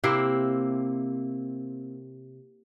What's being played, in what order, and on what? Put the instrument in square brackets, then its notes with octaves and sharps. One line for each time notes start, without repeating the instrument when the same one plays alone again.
[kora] C3 A#3 C4 E4